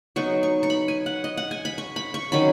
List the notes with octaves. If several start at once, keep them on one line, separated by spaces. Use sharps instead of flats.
F#3 B3 D#4 C#6
C#6
C#6
B5
G#5
F#5
D#5
F#5
G#5
B5
C#6
B5
C#6
D#3 F#3 C#4 B5